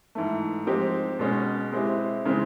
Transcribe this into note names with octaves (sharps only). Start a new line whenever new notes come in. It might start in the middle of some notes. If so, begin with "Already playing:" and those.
G#2 E3 A3
F3 G#3 C4 D#4 G4
B2 G#3 C#4
G#3 C4 E4 G4
C#3 E3 G#3 C4